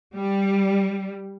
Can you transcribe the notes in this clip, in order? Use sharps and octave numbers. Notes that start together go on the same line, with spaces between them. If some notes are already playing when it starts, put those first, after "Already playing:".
G3